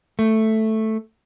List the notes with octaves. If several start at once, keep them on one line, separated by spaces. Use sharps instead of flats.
A3